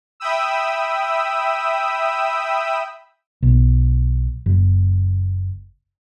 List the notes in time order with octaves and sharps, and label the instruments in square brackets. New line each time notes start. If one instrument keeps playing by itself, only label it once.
[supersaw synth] E5 G5 B5 D#6 E6
[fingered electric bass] B1
F#1